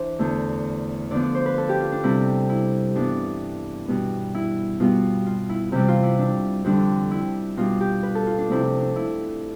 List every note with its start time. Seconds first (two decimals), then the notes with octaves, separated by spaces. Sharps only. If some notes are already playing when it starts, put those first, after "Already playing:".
Already playing: E3 D4 C5 D5
0.19 E2 D3 A3
1.11 D3 F3 B3 D5
1.23 D5
1.35 C5
1.46 B4
1.58 A4
1.69 G4
1.81 F4
1.92 D4
2.03 C3 G3 C4 E4
2.49 E4
2.95 G2 E3 B3 D4
3.88 B2 G3 B3
4.35 E4
4.80 B2 G3 B3 F4
5.27 F4
5.49 E4
5.72 C3 E3 G3 E4
5.88 F4
6.03 E4
6.19 D4
6.65 F2 D3 G3 D4
7.11 E4
7.57 B2 G3 D4 F4
7.81 G4
8.03 B4
8.15 A4
8.27 F4
8.38 D4
8.48 C3 F3 A3 C4 E4
8.65 E4
8.81 D4
8.96 E4